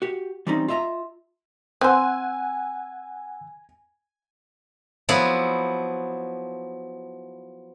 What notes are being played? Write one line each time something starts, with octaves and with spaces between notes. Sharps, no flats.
F#4 G4
E3 G3 C4 C#4 D#4
F4 D#5 E5 A#5
C4 C5 F#5 G#5 E6 F#6
F3 F#3 B3 E4